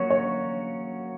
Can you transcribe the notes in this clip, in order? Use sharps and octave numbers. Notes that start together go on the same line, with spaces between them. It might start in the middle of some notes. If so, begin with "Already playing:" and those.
Already playing: F#3 A#3 C#4 F#4 C#5
C#5